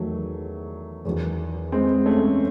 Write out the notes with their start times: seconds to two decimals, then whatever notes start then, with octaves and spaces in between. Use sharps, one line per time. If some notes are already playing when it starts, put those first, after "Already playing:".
Already playing: E2 D#3 F#3 A3
1.05 E2 D#3 F#3
1.72 G#3 C4
2.06 A3 C#4